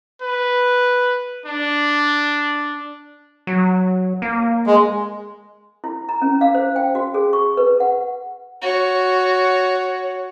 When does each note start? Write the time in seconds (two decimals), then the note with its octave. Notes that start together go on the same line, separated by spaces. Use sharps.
0.22 B4
1.46 D4
3.47 F#3
4.22 A#3
4.67 G#3
5.84 E4
6.09 A#5
6.22 C#4
6.41 F5
6.55 C5
6.76 G5
6.95 F#4
7.14 G#4
7.33 C#6
7.57 B4
7.80 F#5
8.62 F#4 C#5